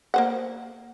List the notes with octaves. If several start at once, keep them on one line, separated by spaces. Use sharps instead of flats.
A#3 C5 F#5